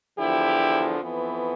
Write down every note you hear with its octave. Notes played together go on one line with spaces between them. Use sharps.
E2 D3 F3 E4 G4
F2 E3 B3